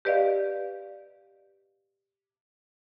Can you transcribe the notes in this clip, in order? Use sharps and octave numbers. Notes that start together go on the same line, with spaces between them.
G4 B4 D5 D#5 F5